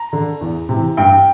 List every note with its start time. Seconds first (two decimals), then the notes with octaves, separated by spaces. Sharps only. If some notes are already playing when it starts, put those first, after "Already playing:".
Already playing: A#5
0.13 D3
0.41 E2
0.69 C3 E3
0.97 G2 G5